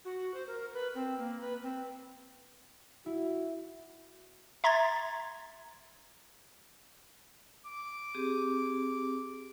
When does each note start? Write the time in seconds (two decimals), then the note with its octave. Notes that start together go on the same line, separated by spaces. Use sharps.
0.05 F#4
0.34 C5
0.47 A#4
0.73 B4
0.95 C4
1.18 A#3
1.41 B4
1.63 C4
3.06 E4 F#4
4.64 E5 A#5 C6 G#6 A6
7.65 D6
8.15 C4 G4 G#4